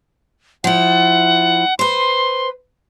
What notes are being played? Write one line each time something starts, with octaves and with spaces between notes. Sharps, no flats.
F3 E4 F#5
B4 C5 C6